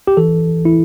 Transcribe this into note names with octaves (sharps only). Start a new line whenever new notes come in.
G4
E3 A4
E3 E4